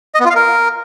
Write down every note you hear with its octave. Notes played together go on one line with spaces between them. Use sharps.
D#5
B3
F4
F5
A#4